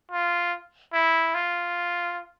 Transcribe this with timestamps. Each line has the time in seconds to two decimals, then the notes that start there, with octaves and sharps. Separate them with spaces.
0.12 F4
0.93 E4
1.34 F4